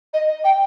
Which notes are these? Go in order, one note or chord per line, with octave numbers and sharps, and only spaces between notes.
D#5
G5